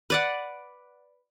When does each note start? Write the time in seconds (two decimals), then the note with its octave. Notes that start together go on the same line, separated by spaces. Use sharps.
0.10 B4 D5 F#5